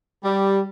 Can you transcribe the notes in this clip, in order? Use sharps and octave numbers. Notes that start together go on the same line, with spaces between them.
G3